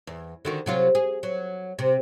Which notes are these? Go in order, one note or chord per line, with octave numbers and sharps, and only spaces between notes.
E2
D3 D#3 F#4
C3 F#3 F4
G#4
F#3
C3